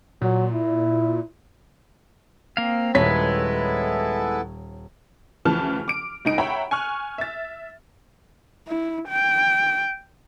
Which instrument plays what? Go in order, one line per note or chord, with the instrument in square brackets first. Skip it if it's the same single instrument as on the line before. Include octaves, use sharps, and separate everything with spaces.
[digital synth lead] A#2 [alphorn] F#3
[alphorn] E4
[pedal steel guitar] A#3 F5 [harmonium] C4
[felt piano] D#1 C#5 B6 [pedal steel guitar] G#3 B4 [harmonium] B3 E4 A4
[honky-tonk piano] D2 C#3 E3 F3 A5 F6
D6 D7
C#2 D#4 D7
C#5 E5 F#5 G5 A#5 B5
G#5 C#6 F6 F#6
E5 A6
[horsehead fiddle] E4
G5